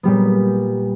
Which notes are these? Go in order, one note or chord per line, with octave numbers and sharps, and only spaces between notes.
A#2 G3 B3